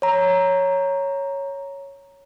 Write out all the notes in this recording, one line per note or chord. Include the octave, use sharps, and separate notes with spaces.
C#5 A#5